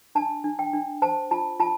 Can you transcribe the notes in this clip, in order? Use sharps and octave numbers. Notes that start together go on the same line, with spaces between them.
D4 A5
D4
G5
D4
C5 A5
F4 A5
F4 A5